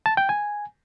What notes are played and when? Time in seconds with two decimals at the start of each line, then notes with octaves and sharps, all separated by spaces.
0.06 A5
0.17 G5
0.29 G#5